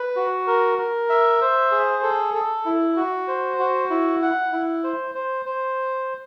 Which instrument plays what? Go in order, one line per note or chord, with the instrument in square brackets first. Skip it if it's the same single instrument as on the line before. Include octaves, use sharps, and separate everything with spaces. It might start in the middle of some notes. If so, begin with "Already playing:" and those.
Already playing: [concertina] B4
F#4
A#4
A#4
E5
C5
G#4
A4
A4
E4
F#4
C5
F#4
E4
F#5
E4
C5
C5
C5